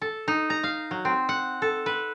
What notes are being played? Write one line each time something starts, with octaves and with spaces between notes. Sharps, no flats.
A4
D#4
A#5
F5
F#3
C4
F#5
A4
B4